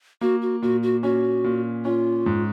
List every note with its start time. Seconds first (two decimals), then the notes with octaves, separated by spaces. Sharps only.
0.21 A#3 F#4
0.42 F#4
0.62 A#2 F#4
0.83 F#4
1.03 C#4 F#4
1.44 A#2
1.85 C#4 F4
2.26 G#2